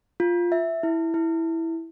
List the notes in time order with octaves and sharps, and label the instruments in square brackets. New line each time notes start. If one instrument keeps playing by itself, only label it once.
[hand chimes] F4
E5
E4
E4